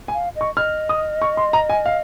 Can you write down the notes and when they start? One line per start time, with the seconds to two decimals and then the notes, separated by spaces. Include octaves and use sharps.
0.08 G#5
0.14 F5
0.36 D#5
0.41 C#6
0.57 D#5 F6
0.89 D#6
1.22 C#6
1.37 C6
1.53 A#5
1.69 G#5
1.86 F5